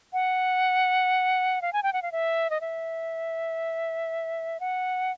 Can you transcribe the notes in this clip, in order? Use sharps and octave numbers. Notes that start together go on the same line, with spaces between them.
F#5
F5
G#5
G5
F#5
F5
E5
D#5
E5
F#5